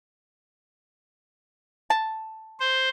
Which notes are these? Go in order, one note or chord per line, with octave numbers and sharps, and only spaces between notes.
A5
C5